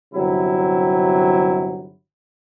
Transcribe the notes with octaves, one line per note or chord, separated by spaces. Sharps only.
G1 C3 F#3 E4